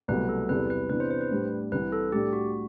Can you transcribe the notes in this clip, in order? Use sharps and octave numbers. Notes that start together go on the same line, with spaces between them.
C2 B2 F#3 A3 B4
A4
E2 C3 E3 G3 B4
B4
C3 E3 B3 D4 B4
C5
C5
B4
A2 G3 D4
C2 C3 E3 B4
A4
A2 G3 D4 G4
F#4